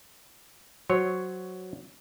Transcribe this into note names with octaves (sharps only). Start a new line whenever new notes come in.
F#3 C5 C#5